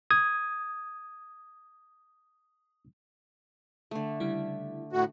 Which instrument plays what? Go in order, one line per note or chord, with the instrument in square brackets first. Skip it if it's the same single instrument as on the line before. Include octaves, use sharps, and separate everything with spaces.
[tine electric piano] D#6 G#6
[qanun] D3 A3
[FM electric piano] C#3 G3 E4
[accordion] A2 F#4